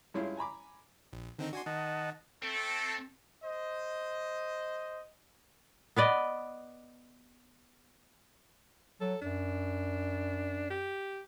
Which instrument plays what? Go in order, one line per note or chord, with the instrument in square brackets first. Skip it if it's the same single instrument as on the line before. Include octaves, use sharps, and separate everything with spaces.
[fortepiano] G2 G#3 C#4 E4 F4
G#5 A#5 B5 D6
[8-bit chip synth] A#1
[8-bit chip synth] D3 C4 D#4 [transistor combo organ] D#3
[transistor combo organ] D4 [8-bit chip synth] F#4 G#5 C6
[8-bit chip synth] D#3 [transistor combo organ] D#5 F#5 A5
[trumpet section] A3 A4 [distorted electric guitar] C4
[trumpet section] C5 D#5
[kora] B3 B4 D5 D#5
[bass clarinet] F#3 [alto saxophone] A4
[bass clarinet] F#2 [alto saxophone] D4
[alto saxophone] G4